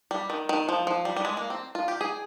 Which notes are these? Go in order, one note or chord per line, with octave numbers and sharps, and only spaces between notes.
G3
D#3
D#3
F3
F3
G3
G3
G#3
A#3
C4
F4
G4
G#4